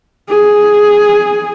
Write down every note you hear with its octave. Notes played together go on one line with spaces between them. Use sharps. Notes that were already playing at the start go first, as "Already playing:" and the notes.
G#4